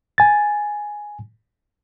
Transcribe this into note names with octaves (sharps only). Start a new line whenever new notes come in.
G#5 A6